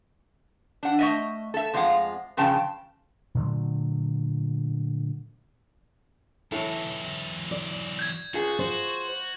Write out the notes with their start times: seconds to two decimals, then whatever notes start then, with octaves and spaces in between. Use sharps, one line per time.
0.83 D4 F#5
0.99 A3 D#5 E5
1.54 A4 E5
1.73 F2 F3 G#3 F4 F#5
2.37 G2 C#3 F3 G5 A5
3.35 A#2 D3 F#3 A3
6.52 E3 F#3 E4 A4
7.51 D5
7.99 G6 G#6
8.34 F4 F#4 G#4
8.59 C5